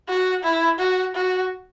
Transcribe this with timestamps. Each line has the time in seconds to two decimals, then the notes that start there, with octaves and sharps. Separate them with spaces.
0.09 F#4
0.43 E4
0.79 F#4
1.15 F#4